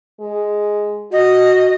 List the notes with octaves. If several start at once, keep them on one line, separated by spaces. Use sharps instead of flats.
G#3
F#4 D#5